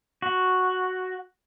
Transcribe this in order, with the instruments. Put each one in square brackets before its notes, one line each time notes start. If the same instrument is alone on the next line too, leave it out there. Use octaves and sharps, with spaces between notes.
[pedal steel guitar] F#4